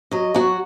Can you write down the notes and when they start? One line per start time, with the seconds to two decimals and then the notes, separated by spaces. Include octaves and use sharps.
0.11 F#3 D#5
0.34 F#3 F#4